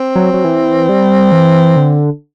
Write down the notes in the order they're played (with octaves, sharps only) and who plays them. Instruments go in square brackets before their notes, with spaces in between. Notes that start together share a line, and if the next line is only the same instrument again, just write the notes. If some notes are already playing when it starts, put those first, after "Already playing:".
Already playing: [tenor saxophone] C4
[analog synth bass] F#3
F#3
E3
G3
E3
D3